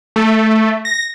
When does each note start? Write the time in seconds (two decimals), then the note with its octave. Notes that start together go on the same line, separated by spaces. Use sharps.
0.16 A3
0.85 A#6